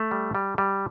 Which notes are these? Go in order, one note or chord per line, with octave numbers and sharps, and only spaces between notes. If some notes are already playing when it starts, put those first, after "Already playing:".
Already playing: A3
G3
G3
G3